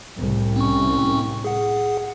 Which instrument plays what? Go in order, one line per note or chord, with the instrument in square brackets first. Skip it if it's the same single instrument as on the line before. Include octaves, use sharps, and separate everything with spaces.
[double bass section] C2 A2
[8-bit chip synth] C4 C#4 C#6
G#4 F#5